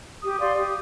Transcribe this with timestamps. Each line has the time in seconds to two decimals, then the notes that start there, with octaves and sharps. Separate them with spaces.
0.22 G4 D#6
0.40 D5 F5 C6
0.57 G4